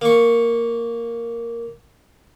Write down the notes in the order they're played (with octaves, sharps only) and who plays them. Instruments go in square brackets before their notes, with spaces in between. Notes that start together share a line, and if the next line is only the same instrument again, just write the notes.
[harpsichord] A#3 C#6